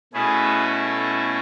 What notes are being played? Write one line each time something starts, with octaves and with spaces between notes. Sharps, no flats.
B2 A3 C#4 E4 G#4 B4
A4